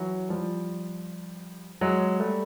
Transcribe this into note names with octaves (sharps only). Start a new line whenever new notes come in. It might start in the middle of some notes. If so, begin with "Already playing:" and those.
Already playing: E3 F#3
F3 G3
F#3 G#3
G3 A3